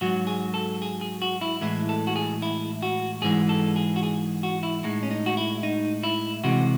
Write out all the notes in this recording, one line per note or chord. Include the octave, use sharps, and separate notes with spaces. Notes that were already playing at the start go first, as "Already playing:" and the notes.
G#2 F#3 F#4
G#4
A4
G#4
G#4
F#4
E4
A2 E3 G#3 E4
A4
F#4
G#4
E4
F#4
G#2 E3 G#3 G#4
A4
G#4
F#4
G#4
F#4
E4
A2 G#3 D#4
C#4
D#4
F#4
E4
D#4
E4
C3 E3 G#3 F#4